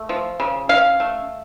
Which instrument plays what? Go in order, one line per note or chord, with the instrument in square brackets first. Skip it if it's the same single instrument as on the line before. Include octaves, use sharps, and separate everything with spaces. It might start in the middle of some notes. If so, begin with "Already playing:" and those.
Already playing: [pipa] A3
F3
C#3
C#4 F5
A3